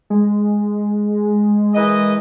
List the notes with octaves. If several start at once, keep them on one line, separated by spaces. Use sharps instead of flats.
G#3
E3 A#4 D#5